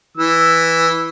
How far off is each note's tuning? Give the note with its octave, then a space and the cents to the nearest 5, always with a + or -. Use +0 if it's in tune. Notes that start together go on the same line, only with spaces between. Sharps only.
E3 +0 E6 +0